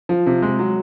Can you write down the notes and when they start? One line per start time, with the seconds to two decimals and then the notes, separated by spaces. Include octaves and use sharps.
0.09 F3
0.26 C3
0.42 G#3
0.59 F#3